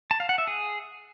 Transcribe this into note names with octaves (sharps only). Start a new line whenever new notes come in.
A5
F5
F#5
E5
G#4